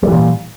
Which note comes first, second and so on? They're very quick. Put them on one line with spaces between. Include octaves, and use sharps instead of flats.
G3 E3 A#2